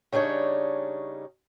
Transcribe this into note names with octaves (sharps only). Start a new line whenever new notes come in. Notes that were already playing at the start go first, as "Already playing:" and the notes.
C#3 G3 D4 D#4 C#5